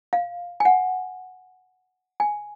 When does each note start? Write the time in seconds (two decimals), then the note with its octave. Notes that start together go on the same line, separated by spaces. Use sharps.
0.13 F5
0.60 G#5
0.65 F#5
2.20 G#5